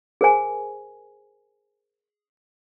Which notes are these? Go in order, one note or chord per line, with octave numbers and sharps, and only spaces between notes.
G#4 A#4 C5 G#5